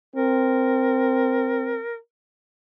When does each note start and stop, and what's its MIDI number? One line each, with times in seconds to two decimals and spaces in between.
0.16 1.79 60
0.16 1.96 70